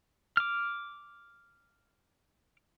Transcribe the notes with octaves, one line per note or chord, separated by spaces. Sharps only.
D6 F6